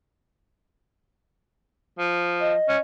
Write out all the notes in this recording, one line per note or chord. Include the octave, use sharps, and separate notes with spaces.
F3
D#5
C#4